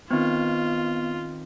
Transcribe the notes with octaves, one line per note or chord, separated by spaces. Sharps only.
D#3 B3 C4 F4